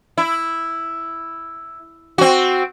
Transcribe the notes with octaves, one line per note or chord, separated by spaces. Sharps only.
E4
C4 F#4